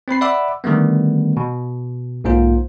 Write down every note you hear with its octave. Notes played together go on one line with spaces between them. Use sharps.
C4 C5 B5 C7
D5 E5 F#5 B5 D6 E6
D3 D#3 G3 A3 B3
B2
B1 G#2 A#3 F4 C5